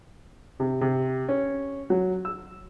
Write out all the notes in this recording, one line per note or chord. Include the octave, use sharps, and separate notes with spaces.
C3
C3
C#4
F#3
E6